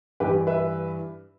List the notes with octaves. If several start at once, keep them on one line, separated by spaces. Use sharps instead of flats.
G2 E3 G4 B4
B4 E5